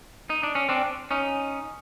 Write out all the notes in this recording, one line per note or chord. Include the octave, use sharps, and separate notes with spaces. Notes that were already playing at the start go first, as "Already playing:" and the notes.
D#4
D4
C#4
C4 D4
C#4 D#4